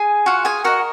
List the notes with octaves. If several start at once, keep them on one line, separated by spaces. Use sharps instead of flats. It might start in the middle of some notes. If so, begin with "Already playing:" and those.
Already playing: G#4 G#5
F4 F#4 F#5
G#4 G#5
F#4 A#4 D#5 F#5